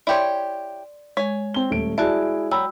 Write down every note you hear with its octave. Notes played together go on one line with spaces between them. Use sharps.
E4 G4 C#5 D5 C6
G#3 C#5 G#5
C4 G7
D#1 A3 D7
E4 F#4 G#4 D5 A5
F#3 G5 B5 E6